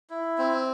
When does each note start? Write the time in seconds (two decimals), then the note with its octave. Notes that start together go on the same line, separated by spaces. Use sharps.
0.10 E4
0.38 C4